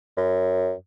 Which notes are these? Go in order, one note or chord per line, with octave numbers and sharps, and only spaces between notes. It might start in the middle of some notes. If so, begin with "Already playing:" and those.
F#2